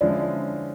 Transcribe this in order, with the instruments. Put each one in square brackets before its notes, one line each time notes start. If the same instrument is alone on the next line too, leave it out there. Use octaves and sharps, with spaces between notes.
[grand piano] D3 F3 G#3 C#4 E4 [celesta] D5